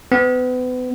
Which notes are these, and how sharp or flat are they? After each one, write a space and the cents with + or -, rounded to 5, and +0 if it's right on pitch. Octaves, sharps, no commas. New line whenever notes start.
B3 +35